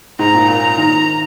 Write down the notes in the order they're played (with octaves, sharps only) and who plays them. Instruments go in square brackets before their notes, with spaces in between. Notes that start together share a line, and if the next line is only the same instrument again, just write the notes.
[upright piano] G#2 [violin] A#5
[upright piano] A#2
[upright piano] A#2 [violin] A#5
[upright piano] D#3